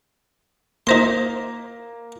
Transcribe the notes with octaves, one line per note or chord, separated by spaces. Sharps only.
A#3 D#4 C5 C6 A#6 B6